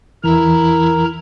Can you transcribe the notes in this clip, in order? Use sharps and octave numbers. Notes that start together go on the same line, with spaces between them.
E2 E3 E4 A#4 A#5